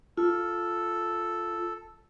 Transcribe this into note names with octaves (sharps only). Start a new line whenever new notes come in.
F4 A4